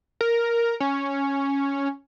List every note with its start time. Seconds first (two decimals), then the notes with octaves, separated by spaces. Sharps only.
0.21 A#4
0.80 C#4